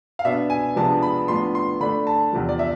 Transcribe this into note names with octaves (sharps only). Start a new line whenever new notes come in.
F5
B2 B3 D4 E5
G#5
C3 F3 G#3 B3 D4 A5
B5
A2 F3 B3 D4 C6
C6
D3 A3 D4 B5
A5
E2 C3 F3
D5
E5